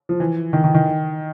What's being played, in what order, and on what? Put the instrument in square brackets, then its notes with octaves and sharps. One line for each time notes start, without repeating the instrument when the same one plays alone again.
[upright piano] F3
E3
D#3
D#3
D#3